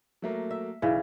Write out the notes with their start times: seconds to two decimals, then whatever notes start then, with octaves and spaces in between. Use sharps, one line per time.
0.22 F#3 A3 A#3
0.51 E5
0.82 B1 C#3 E3